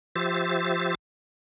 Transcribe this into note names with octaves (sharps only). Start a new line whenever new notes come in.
F3 G4 C5 E5 A6